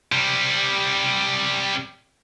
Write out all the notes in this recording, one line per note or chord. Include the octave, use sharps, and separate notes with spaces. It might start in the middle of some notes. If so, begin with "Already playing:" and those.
C3 G3